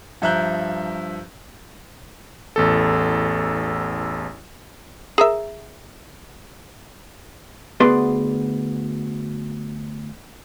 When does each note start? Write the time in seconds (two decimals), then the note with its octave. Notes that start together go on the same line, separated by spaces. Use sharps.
0.22 G2 F3 E5 A#5 F#6 G6
2.56 A1 E2 A4
5.18 G#4 A#4 E5
7.80 D2 B3 G#4 B4 D5 C6